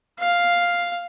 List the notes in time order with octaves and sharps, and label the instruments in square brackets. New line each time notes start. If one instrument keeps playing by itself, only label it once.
[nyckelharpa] F5